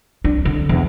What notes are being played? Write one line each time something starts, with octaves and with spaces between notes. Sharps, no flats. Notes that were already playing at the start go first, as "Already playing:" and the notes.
D4
D3
E2